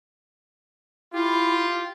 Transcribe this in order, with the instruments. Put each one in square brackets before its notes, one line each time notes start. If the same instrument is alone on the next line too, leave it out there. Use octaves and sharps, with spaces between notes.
[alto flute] E4 [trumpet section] F4 G4